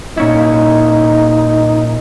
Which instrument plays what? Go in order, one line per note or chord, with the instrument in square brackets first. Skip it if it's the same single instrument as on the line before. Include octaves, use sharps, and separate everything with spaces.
[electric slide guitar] A#2 C#4 E4 [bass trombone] D#4